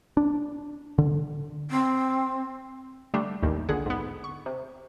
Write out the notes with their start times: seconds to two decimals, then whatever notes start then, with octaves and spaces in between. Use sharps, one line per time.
0.17 D4
0.98 D3
1.70 C4
3.14 D3 G3 A3 D4
3.42 A1 D#2 D#3
3.69 A#1 D3 G#4 F#5
3.86 G#2 B3
4.24 C#6
4.46 C3